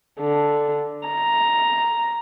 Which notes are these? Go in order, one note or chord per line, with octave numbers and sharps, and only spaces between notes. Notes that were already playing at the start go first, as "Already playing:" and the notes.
D3
A#5